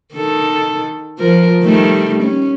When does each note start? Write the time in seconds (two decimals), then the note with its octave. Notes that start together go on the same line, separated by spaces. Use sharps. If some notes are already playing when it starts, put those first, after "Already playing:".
0.14 D#3 A4
1.19 F3 A#4
1.63 D#3 G3 A3
2.23 C#4